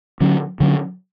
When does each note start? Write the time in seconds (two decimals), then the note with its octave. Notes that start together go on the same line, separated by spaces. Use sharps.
0.21 D3 F#3 C#4
0.60 D3 F#3 C#4